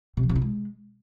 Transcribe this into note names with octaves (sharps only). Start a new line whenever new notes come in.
C3
F3
C3
E4
G#3